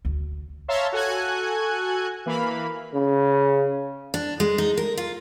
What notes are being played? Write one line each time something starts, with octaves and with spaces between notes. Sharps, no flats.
D2
C#5 E5 F5 A5 A#5 C6
F#4 A4 G#5 F#6 G#6
E3 A#3 F5 B5
C#3
D4
G#3
D#4
A#4
F4